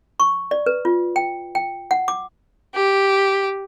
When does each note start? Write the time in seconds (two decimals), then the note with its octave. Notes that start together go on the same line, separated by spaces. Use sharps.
0.20 C#6
0.51 D5
0.66 B4
0.85 F4
1.16 G5
1.55 G5
1.91 F#5
2.08 D6
2.75 G4